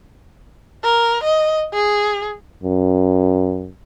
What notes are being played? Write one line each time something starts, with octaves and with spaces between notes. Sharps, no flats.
A#4
D#5
G#4
F#2